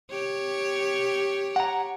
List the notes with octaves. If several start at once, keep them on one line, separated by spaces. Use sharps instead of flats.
G4 C#5
F#5 A#5